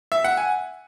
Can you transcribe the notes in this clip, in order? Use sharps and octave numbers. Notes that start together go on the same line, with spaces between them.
E5
F#5
G#5